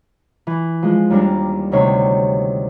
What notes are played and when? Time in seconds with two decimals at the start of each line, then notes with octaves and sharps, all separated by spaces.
0.47 E3
0.83 F3 G#3
1.10 D#2 G3 D4 A#4
1.72 D2 C3 D#3 C#5 C6